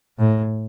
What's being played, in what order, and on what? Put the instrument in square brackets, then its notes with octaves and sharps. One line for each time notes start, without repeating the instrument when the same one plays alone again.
[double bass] A2